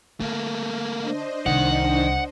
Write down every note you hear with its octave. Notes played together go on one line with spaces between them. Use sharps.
D3 A3 A#3
D4 C5 D#5
C2 D#3 F#5